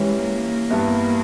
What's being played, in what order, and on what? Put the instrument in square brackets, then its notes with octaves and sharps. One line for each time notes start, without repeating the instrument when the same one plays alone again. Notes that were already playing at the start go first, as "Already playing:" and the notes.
Already playing: [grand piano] E3 G3 C#4 [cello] G#3
[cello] A#3
[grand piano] G2 G3 B3 E4